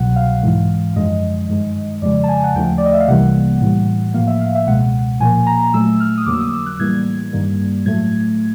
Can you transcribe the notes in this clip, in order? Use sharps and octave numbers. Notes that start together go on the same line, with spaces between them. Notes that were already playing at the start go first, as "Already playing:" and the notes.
Already playing: C2 B2 F#3 F#5
F5
G#2 E3 G#3
F#2 D3 F3 G#3 D#5
G2 D#3 G#3
F2 C#3 F3 G#3 D5
A5
G#5
F#5
D#2 D3 F3 A3 G5
D5
D#5
E5
F5
C2 C3 E3 G3 A#3 F#5
A2 E3 G3
A2 F3 A#3 F5
E5
F5
E5
C#2 B2 G#3 F#5
A#2 F3 A#3 G#5
A#5
A#2 F#3 A3 E6
F6
D#6
F2 D3 F#3 A#3 D6
E6
D#6
E6
F#6
A2 E3 G3 A#3 G#6
G2 D#3 G3 A#3
A2 F#3 A3 G#6